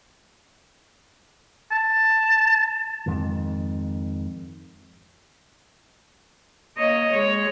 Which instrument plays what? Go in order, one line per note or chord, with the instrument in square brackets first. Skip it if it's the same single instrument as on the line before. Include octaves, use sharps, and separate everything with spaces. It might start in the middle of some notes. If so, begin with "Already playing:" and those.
[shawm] A5
[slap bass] F2 G#2 D#3
[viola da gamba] A#3 C#5 D#5
G#3 C#5